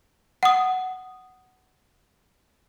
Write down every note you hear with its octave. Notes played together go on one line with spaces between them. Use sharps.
F#5 D#6